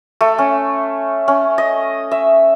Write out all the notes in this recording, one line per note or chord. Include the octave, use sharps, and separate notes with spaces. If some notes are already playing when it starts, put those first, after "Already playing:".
A3
C#4
C#4
D#5
E5